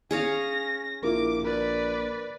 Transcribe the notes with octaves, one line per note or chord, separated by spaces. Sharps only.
C#4 G#4 C#5 F5 A#6
A#1 E4 F4 A#4 D6
A#4 B4 D5